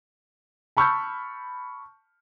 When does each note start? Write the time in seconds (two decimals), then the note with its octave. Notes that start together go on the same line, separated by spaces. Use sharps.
0.77 A5 B5 C#6 E6 F6 G6